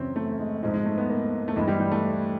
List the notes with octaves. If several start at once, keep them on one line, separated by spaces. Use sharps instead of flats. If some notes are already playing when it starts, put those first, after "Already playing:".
Already playing: F#2 C#3 E3 C4 C#4
A3
G#3
G#2 F3 G#3
G#3
A3
B3
A#3
A3
G2 E3 G#3
G3
G3
A3